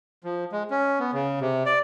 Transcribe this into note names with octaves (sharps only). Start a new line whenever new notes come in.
F3
G#3
C#4
B3
C#3
C3
D5